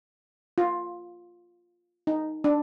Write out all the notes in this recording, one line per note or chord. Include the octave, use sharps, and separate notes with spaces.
F4
D#4
D4